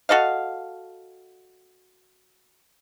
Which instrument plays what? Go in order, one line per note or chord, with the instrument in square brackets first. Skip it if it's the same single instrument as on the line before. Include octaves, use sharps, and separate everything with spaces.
[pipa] F#4 A4 D#5 F5